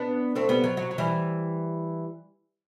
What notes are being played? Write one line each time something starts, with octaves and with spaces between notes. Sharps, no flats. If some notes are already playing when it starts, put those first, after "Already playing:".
Already playing: B3 D4
A3 C4
G3 B3
F#3
F#3
F#3
E3 G3